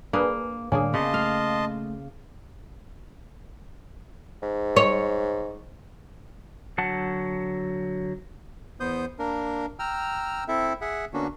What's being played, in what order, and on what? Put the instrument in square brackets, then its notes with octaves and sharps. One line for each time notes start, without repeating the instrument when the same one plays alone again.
[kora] A#3 [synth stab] D4 G#4 B4
[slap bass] A2 D3 G3 [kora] A#3 [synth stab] C#4 D4 G#4
[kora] C#3 [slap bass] B3 [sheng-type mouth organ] D#5 A5 C6
[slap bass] A3 [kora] F5
[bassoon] G#2
[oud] C#5
[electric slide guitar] D3 F#3 F#5 A5
[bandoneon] E2 B3 C5 D#6 G6
A#3 D4 A#4
G5 A#5 E6 F6
C4 E4 A4 E5
G#4 E5 F#5
D3 A#3 B3 C#4 D4 F#4